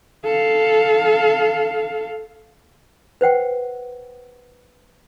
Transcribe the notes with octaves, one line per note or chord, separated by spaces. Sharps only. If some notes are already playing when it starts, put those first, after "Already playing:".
A4 F5
B4 C5 F#5 G5